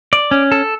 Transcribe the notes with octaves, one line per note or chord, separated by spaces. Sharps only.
D5
C#4
A4